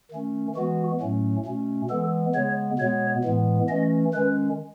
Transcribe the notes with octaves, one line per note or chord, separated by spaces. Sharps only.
D#3 A3 C#4
E3 G#3 B3 F#4
A2 F#3 A3 C#4
B2 A3 C#4
E3 G#3 B3 A4
C#3 G#3 B3 C#5
B2 G#3 B3 C#5
A2 E3 G#3 B3
E3 A3 C#4 D#5
D#3 G#3 C#4 B4